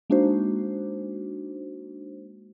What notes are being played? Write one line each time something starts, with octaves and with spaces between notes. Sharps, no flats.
G#3 A#3 D4 D#4 F#4 C5